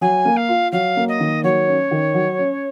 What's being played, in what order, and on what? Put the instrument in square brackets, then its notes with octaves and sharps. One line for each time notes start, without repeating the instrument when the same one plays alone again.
[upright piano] F#3 [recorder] G#5
[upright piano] A#3
[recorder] F5
[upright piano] F4
[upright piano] F#3 [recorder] F5
[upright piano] A#3
[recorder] D#5
[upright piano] D#3
[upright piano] F#3 [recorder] C#5
[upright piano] C#4
D#3
F#3
C#4